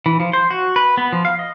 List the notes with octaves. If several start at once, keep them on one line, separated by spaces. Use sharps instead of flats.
E3
F3
C5
F#4
B4
B3
F3
F5
D#5